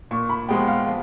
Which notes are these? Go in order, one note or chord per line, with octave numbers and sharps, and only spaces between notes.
A#2 C#6
B5
F3 G#3 B3 G5
F5
F3